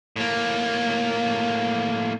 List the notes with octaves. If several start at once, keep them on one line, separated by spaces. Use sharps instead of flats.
A2 A#3